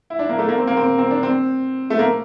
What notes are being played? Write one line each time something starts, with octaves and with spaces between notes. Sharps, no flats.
E4
D4
A#3
A3
A#3
C4
A#3
C4
C4
D4
C4
A3
A#3